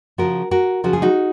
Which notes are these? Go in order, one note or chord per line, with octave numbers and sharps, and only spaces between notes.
C#3 F3 F#4 A#4
F#4 A#4
C#3 F3 F#4
G#4
D#4 F#4